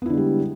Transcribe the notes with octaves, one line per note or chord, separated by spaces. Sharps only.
D3 G3 G#3 B3 E4